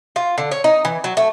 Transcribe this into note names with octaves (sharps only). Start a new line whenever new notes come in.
F4
D3
C#5
D#4
E3
F#3
A3